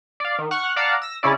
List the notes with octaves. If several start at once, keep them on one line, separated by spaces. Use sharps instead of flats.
D5 F5
D#3
F#5 C#6 F6 F#6
D5 F5 F#5 A5 A#5
E6 A#6
C#3 C#4 E4 D5